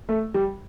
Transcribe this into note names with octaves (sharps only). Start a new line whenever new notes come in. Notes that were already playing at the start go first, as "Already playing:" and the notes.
A3
G3